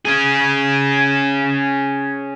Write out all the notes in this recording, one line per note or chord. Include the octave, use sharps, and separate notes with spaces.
C#4 G#4